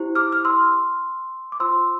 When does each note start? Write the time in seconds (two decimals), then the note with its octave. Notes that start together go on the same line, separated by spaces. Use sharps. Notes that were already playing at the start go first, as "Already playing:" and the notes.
Already playing: E4 G4 C5
0.15 D6 F6
0.32 F6
0.45 C6 E6
1.52 D6
1.60 F4 C5 C6 E6